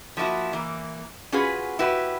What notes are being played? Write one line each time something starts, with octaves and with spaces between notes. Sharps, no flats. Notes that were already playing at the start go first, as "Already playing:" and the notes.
F3 A#3 E4 F#4
E3 A#3
C#4 F4 F#4 G#4 B4
E4 F#4 G4 B4